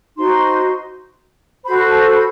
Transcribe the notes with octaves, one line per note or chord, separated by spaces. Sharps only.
D#4 F#4 C5 C6
F#4 A4 C5 B5
A5
B5